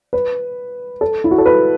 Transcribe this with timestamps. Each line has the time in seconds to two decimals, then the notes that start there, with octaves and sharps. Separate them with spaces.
0.13 B4
1.01 A4
1.24 E4
1.31 F#4
1.38 A4
1.46 B4